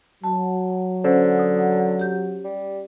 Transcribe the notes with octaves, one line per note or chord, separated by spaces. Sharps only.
F#3 A5
D3 C#4 C5
D#6
G4 G6
G3